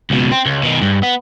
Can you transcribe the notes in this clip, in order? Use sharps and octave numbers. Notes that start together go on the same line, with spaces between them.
C#2 B2
C4
C#2
B2 D#3
G2
B3